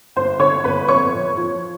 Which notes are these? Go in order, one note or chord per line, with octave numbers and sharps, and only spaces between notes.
G1 C5 C6
D3 C#5 C#6
G1 B4 B5
F2 C#5 C#6
F2
F3